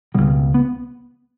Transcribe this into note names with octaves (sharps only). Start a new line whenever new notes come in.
C#2 B2 G3
B3